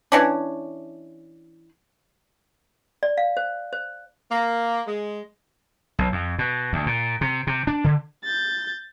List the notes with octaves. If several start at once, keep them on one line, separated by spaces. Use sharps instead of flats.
E3 C#4 D4
D5
F5
C5
C5
A#3
G#3
B1
F2
B2
D2
A#2
C3
C3
D4
D3
G6 A6